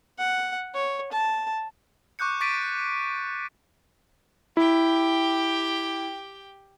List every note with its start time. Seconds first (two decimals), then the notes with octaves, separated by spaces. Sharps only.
0.18 F#5
0.75 C#5
1.12 A5
2.19 C#6 D6 F#6 G6 C#7
2.40 C#6 D6 A6 B6 D7 D#7
4.57 E4 G4 G5